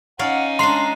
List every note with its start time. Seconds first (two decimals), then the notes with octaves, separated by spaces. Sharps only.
0.19 C#4 D#4 C#5 D5 F5 F#5
0.59 G#3 D4 A#5 C6 C7